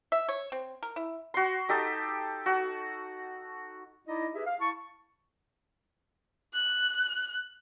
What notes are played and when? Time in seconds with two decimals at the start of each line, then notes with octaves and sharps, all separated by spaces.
0.12 E5
0.29 C#5
0.52 C4
0.83 A#4
0.96 E4
1.34 F#4 C6
1.69 D#4 G4 A4
2.46 F#4
4.07 D#4 E4 D5 D#5
4.34 G4 G#4 B4 E5
4.46 F5
4.60 E4 A5 C#6
6.54 F#6